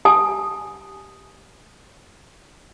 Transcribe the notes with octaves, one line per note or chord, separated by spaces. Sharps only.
G4 G#5 A5 D#6